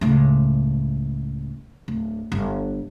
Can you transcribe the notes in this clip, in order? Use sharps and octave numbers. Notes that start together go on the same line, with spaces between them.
C#2 A2
D1
G1